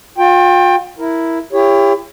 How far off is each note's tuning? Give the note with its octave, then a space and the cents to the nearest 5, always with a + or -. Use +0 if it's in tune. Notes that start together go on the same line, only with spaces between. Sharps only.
F4 +40 G5 +15
E4 +0 A#4 +0
E4 +35 G4 +35 C#5 +0